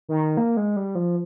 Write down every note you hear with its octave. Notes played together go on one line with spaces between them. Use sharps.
D#3
A#3
G#3
G3
F3